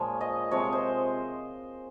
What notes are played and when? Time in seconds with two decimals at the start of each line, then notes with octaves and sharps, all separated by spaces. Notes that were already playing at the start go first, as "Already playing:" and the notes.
Already playing: A#2 F3 G#3 C#5
0.21 D#5
0.51 C3 F3 G#3 C#5
0.73 C5